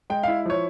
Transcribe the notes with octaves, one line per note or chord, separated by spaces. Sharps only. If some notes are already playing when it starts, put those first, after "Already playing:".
G#3 G5
E4 F5
F3 C#5